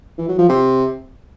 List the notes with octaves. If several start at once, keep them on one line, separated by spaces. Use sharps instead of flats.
E3
F#3
F3
C3